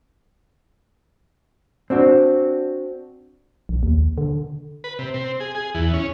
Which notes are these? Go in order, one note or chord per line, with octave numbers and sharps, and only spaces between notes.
C4 D4 F#4
A#1
D#2
D3
B4
C3
C4
G#4
G#4
E2
C#4